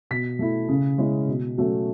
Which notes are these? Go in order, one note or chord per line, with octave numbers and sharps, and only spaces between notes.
B2 B6
A3 E4
C#3
G#3 C#4 E4
B2
F#3 A3 C#4